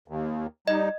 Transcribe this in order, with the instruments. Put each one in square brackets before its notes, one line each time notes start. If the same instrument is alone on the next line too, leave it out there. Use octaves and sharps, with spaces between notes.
[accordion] D#2
[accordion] G3 D#4 [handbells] D#5